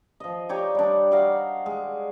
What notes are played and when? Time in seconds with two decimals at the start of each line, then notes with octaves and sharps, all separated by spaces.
0.20 F3 D#5
0.49 D#4 G4 C#5 D5
0.75 G3 D4
1.11 D#4 F#4 D5 F5
1.66 G#3